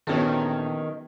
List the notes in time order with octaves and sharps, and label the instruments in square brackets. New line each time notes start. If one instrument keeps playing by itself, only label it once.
[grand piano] A#1 G4 A4 [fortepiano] E2 C#4 [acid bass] D#3 [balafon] B3 F#4